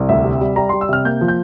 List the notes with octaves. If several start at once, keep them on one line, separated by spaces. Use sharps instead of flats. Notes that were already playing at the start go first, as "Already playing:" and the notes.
Already playing: C2
D2 E5
C3
G3
G3 A#5
G3 C6
E6
C3 F6
A#3 G6
F3
G6